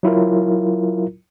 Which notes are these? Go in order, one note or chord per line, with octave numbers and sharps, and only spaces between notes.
F#3 E4 F4 A#4